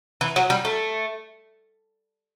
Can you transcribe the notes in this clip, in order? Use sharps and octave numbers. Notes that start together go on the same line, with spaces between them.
E3
F#3
G3
A3